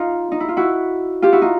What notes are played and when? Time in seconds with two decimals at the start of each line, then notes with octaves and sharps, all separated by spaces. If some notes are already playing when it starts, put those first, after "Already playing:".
Already playing: D#4 F4
0.32 D#4
0.40 E4
0.48 F4
0.57 E4 F#4
1.22 F4 G4
1.33 E4 F#4
1.41 D#4 F4